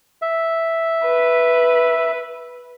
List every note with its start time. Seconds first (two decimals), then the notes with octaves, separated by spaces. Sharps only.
0.22 E5
1.05 B4